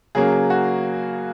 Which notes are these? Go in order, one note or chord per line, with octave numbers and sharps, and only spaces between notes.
C#3 F#3 A#3 G#4
G#4
F#4